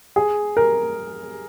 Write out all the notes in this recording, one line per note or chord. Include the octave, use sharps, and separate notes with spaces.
G#4
A#4